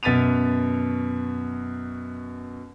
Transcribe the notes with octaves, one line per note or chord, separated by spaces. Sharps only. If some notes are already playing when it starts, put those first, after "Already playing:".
F#2 B2 A6 B6 D#7 F7